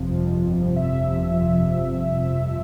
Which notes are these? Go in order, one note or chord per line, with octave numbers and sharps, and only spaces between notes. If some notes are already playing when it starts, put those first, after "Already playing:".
Already playing: G1 F2 C3 F3
F2
C3
G1
F3
F2 E5
C3
G1
F3
F2
C3